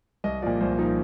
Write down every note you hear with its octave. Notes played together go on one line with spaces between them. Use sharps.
C2 D#5
A#2 F3 D5
C2 C5
A#2 F3 D#4